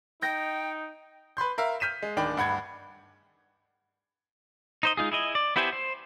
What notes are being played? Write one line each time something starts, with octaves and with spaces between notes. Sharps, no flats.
D#4 G5 G6 A#6
B4 B5 C6 G6
A#4 E5 F5
F6 G6 B6 D#7 E7
G#3
D1 D#3 D4 G5 B5
D1 G2 F#5 B5 G#6
D#4 C5 D#5
G#3 D#4 F4 G#4
E4 G#4 D#5
D5
B3 E4 G4 C5 G#5
C5